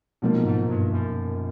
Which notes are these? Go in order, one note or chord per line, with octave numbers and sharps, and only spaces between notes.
B1 A#2 F3 A#3
G#2
G2
F#2